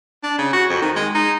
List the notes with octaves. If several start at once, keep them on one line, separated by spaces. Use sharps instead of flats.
D4
C#3
F#4
F2
D#3
G#3
D#4